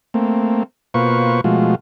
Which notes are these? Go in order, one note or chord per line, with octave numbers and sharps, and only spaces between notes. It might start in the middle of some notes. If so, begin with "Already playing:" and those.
A3 A#3 C4
B2 A#3 F4 B4 C5 C#6
B2 F3 G#3 A3 F4 F#4